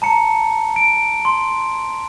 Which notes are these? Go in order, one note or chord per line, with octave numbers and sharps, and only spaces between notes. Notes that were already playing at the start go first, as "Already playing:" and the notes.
A5 A#5 C#7
D7
C6